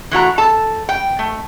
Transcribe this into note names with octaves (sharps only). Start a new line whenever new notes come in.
E3 A3 F#4 A#5
A4 A5
G5
A3